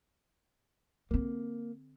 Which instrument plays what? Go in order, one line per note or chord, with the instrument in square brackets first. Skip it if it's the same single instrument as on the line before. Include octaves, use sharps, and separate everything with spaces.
[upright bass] D3 C4 [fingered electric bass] A#3